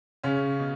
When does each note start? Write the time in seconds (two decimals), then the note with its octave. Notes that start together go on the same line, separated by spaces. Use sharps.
0.23 C#3 C#4
0.60 B2